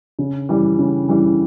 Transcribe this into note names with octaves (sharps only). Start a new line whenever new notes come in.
C#3
E3 G3
C#3
E3 G3